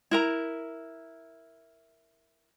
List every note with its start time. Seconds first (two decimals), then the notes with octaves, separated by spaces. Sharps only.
0.11 E4 A#4 A#5